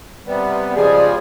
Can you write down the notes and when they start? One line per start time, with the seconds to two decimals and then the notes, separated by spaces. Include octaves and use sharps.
0.27 C3 G3 B3
0.76 C#3 F3 G3 G#3 G#4 D5